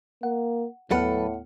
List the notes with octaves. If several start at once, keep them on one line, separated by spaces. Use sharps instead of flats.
A#3 F#5
D#2 A2 F#3 B3 A4 B4 F#5 F6